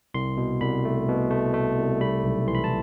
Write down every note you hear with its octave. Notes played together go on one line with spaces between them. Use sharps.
C2 C6
B2
C2 B5
A3
B2
A3
A3
C2
G3 B5
B1
E3 C6
B5
A5